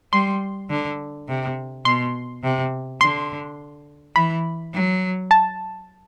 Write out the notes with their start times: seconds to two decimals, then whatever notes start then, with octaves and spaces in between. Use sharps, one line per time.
0.12 G3 C6
0.70 D3
1.28 C3
1.85 B2 C6
2.43 C3
3.01 D3 C6
4.16 E3 B5
4.74 F#3
5.31 A5